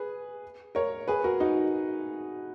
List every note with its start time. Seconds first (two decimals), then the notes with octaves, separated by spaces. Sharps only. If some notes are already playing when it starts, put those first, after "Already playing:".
Already playing: G#4 B4
0.75 A#4 C#5
1.08 G#4 B4
1.24 F#4 A#4
1.40 D#4 F#4